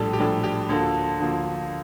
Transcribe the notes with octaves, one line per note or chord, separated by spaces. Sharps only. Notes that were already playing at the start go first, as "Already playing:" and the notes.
Already playing: A#1 A2 G3 D4 G4 A4
G4
A#1 A2 G3 D4 A4
G4
D2 D3 F3 A#3 A4
D2 D3 F3 A#3